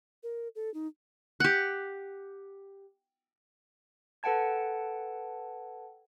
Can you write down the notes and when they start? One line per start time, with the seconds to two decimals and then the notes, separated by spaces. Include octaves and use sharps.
0.23 A#4
0.55 A4
0.74 D#4
1.40 G4 F#5
4.23 A4 B4 F#5 G5 A5 G#6